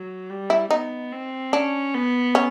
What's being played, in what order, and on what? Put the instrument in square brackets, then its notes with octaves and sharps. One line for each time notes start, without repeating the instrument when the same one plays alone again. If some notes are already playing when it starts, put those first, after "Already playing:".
Already playing: [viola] F#3
G3
[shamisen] E4
[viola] B3 [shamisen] D#4
[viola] C4
[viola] C#4 [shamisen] D4
[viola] B3
[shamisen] C#4